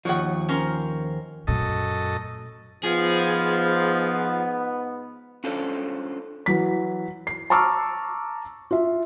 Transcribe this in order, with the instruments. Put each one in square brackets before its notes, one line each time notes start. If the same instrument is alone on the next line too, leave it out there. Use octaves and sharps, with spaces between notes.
[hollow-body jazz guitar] D#2 F3 [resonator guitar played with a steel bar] F#4 C#5 F#5
[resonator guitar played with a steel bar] C#4 A#4 C5
[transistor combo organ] F#2 A4 D#5 [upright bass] A#2 A3
[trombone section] G#2 B3 [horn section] F3 [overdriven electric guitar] G#4
[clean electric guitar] C#4 D4 F4 A4 C5 C#5
[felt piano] E3 F#3 B6
C7
A5 A#5 C#6 D6 E6 F6
F4 E5